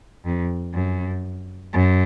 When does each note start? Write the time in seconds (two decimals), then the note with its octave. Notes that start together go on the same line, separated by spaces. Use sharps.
0.25 F2
0.74 F#2
1.74 F#2